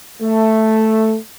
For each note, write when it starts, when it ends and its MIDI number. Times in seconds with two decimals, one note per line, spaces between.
0.22 1.16 57